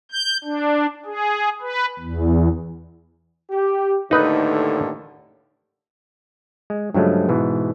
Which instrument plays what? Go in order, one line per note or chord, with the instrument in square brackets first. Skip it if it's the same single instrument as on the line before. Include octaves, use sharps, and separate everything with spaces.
[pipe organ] G6
D4
G#4
B4
E2
[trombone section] G4
[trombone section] D#2 A2 D3 [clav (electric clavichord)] D#4 B4
[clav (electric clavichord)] G#3
G2 C#3 F3 F#3 G#3 A3
G#2 B2 E3